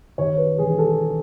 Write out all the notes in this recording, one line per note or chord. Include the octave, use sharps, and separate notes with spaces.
D#2 C#5
B4
E1 G#4
A4